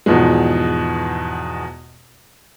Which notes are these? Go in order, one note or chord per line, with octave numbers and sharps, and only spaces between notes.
E2 G#2 B2 F3 G#3